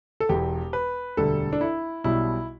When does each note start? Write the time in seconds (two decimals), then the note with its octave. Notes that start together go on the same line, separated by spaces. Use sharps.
0.20 A4
0.29 E1 E2 E3 G4
0.73 B4
1.17 E1 D2 D3 G3 A4
1.53 D4
1.61 E4
2.04 B1 B2 G3 E4